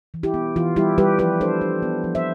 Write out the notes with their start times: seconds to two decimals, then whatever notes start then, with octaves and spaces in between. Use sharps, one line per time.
0.14 E3
0.23 E4 G4
0.34 B3
0.56 E3 F4
0.76 G3 E4 G4
0.98 G3 G4 B4
1.19 F3 G4 B4
1.41 D4 A4 C5
1.61 D4
1.83 B3
2.04 F3
2.15 C5 E5